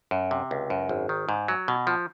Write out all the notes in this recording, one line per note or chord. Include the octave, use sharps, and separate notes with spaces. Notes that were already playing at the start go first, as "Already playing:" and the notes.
F#2
C3
C#2
F#2
G#1
D#3
G#2
F#3
B2
F3